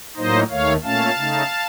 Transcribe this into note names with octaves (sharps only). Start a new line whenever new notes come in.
A2 F#3 A#3 D#4 C5 D#5
D#2 D#3 A3 C#5 F5
A#2 A3 C#4 F5 A5
C#3 A3 D#4